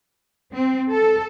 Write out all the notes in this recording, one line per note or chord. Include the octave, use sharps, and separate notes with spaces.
C4
A4